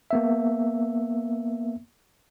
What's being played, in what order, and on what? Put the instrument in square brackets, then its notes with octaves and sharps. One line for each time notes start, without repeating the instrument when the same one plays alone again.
[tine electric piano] A#3 B3 E5